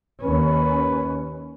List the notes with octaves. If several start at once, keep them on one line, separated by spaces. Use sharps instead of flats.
D#2 C#4 B4